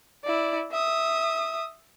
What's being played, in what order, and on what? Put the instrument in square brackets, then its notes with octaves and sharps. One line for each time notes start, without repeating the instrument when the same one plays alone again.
[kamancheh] E4 D5
E5 D#6